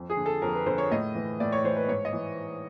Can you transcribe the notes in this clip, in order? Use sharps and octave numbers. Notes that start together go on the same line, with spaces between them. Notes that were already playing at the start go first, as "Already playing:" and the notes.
Already playing: F2
G#4
D3
A4
F2 A#4
B4
D3 C5
C#5
A2 D#5
E3
A2 D5
C#5
E3 C5
B4
G#2 C#5
D#5
E3